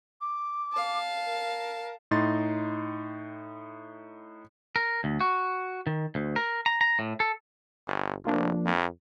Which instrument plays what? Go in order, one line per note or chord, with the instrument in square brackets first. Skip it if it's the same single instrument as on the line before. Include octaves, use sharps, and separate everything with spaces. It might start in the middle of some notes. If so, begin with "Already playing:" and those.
[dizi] D6
[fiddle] F5 A5
[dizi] A#4
[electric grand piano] A2 D#4 C6 A6
[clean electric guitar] A#4
D2
F#4
D#3
D2
A#4
A#5
A#5
A2
A4
[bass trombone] G1
[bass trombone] F1 [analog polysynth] F3 A#3 D4
[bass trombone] F2